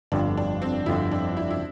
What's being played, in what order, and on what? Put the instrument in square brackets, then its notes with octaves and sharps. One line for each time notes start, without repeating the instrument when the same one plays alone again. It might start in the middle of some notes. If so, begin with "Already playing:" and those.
[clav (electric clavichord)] G1 F2 D3 [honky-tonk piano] D4
[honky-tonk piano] D4
C4
[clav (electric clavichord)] G1 F2 D3 [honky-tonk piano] E4
[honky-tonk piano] D4
E4
E4